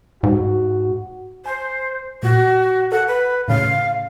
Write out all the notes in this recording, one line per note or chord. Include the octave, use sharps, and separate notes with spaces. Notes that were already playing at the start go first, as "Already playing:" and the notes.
G#2 F#4
C5 G#5
A#2 F#4
A4 F#5
B4
A2 C#3 F5